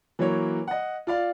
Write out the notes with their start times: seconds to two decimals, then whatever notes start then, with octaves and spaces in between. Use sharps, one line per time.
0.19 E3 F#3 A#3 C#5
0.68 D#5 F#5
1.07 F4 D5 F5